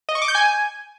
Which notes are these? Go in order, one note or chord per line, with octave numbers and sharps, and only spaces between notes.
D#5
C#6
D6
G6
G#5